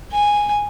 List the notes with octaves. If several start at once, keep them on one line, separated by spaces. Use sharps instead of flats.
G#5